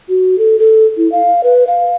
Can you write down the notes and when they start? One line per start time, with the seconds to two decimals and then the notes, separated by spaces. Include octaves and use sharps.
0.09 F#4
0.38 A4
0.59 A4
0.97 E4
1.12 F5
1.44 B4
1.67 F5